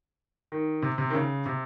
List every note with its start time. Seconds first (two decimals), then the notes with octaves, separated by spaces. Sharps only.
0.52 D#3
0.82 C3
0.98 C3
1.10 D#3
1.14 C#3
1.46 C3